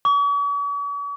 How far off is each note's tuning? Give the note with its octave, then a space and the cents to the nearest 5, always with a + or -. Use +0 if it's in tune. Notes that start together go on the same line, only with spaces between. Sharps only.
C#6 +45